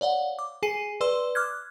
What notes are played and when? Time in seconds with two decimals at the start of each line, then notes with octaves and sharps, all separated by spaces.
0.01 C#5 D5 F5 F#5
0.39 D6
0.63 G#4 G#5 C7 D#7
1.01 B4 D5 C6 E6
1.35 D6 F6 F#6 G#6